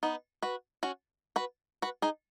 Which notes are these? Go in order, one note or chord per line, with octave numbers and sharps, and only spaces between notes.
B3 D#4
F#4 B4
C#4 F#4
F#4 B4
F#4 B4
D#4 G#4